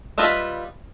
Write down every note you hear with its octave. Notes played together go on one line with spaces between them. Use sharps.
G3 F4 B4 D#5 E5